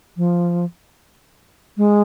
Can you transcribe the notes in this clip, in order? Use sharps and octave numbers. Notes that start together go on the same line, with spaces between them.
F3
G#3